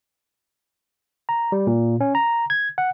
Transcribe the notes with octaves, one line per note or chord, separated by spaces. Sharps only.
A#5
G3
A#2
C#4
A#5
G#6
F#5